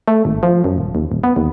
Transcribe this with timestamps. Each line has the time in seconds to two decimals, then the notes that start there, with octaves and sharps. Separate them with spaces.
0.08 A3
0.25 G#1
0.43 F3
0.64 F#2
0.78 D#1
0.95 D#2
1.12 D#1
1.24 B3
1.36 D#2